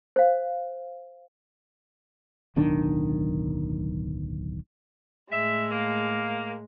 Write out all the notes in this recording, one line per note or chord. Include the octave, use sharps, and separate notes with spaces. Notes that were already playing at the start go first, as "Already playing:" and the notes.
C5 F5
D1 B1 D#3 D4
A2 G#3 E5
A#3